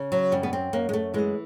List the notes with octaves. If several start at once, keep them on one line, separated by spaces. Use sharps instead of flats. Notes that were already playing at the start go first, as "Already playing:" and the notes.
Already playing: C#3
F#3
F#2 G3
B3
C4
F#2 A#3
G#3
A3
E3 G#3